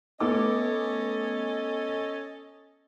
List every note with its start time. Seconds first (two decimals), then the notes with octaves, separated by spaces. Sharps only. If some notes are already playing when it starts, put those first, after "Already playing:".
0.20 A3 B3 C#4 A4 D#5 D6